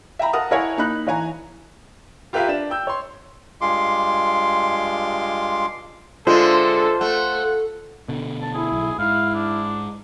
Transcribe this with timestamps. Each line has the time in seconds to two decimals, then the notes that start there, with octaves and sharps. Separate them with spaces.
0.19 E5 G5 A#5 B5
0.33 A#4 F#5 A5 D#6
0.51 E4 A#4 C#5 F#5 G#5
0.77 A#3 D#4 B5 F#6
1.07 E3 C#5 G#5 A#5
2.33 F4 G4 A#4 B4 E5 F5
2.48 D4 E7
2.70 G5 E6 G6
2.87 C#5 C6
3.61 G2 G#3 F4 C6 D6
6.27 D3 G#3 F4 A4 C5 E5
7.01 A3 F#5
8.08 B2 D3
8.42 A5
8.54 E4 G#4
8.72 B1
8.99 G#2 E4 F5
9.35 D4